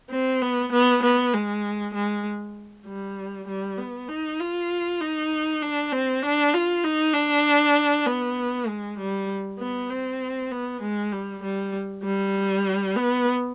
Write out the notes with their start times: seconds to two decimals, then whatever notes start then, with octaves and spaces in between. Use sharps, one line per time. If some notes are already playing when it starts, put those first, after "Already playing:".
0.11 C4
0.42 B3
0.73 B3
1.03 B3
1.34 G#3
1.94 G#3
2.86 G3
3.48 G3
3.78 B3
4.09 D#4
4.40 F4
5.01 D#4
5.62 D4
5.92 C4
6.23 D4
6.54 F4
6.84 D#4
7.14 D4
8.07 B3
8.68 G#3
8.99 G3
9.60 B3
9.90 C4
10.52 B3
10.82 G#3
11.13 G3
11.43 G3
12.04 G3
12.96 B3